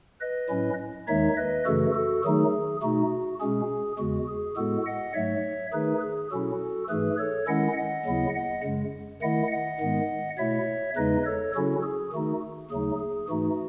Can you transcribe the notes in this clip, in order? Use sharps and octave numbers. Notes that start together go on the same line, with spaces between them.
B4 D#5
A2 F#3 C#4 E4
D#2 D#3 G#3 D#4 C#5 E5
B4 D#5
F#2 C#3 E3 A3 F#4 A4
F#4 A4
D#3 F#3 A3 D#4 G#4
B2 A3 D#4 F#4
B2 G#3 C#4 G#4
E2 C#3 G#3 F#4
G#4
A2 G#3 B3 F#4 A4
D#5 F#5
G#2 F#3 A3 C#5 E5
D#3 A3 D#4 G#4 B4
G#4
B2 F#3 C#4 E4 F#4 A4
G#2 E3 A3 G#4 B4
A4 C#5
D#3 G#3 C#4 E4 D#5 F#5
D#5 F#5
D#2 C#3 F#3 B3 E4
D#5 F#5
F#2 C#3 G#3
D#3 A3 E4 D#5 F#5
D#5 F#5
G#2 D#3 G#3 B3
B2 A3 E4 C#5 E5
E2 C#3 G#3 D#4 B4 D#5
A4 C#5
C#3 F#3 C#4 E4 F#4 A4
G#4
D#3 A3 D#4 F#4
D#2 C#3 F#3 A3 D#4 G#4
G#4
G#2 E3 A3 D#4 F#4